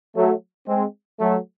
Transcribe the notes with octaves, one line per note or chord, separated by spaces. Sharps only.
F#3 A3
G#3 C4
F#3 A3